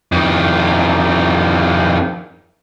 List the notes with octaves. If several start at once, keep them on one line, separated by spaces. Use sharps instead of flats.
F2 D#3